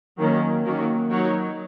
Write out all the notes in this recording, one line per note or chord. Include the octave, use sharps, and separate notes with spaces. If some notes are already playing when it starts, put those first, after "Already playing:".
D#3 F#3 A#3 C#4
D#3 F#3 A#3 C#4 F#4
F#3 D#4 F#4 A#4 C#5